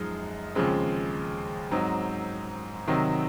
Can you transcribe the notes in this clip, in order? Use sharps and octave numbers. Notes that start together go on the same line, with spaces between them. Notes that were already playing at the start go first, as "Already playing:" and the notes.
Already playing: F#2 F3 G#3 D#4
D#2 C#3 F3 G#3 C4
G#2 F#3 C4 D#4
C3 D#3 F#3 C4 D#4